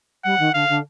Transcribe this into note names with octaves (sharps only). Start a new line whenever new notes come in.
G3 F#5
D#3
D3 F5
D3